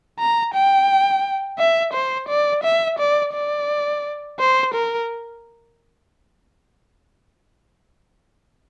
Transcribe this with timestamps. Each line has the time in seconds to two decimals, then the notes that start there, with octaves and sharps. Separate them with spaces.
0.19 A#5
0.54 G5
1.59 E5
1.93 C5
2.29 D5
2.64 E5
2.99 D5
3.34 D5
4.39 C5
4.74 A#4